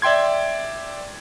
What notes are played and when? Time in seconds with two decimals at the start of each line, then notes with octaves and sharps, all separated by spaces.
0.02 D5 E5 G5 C6 G#6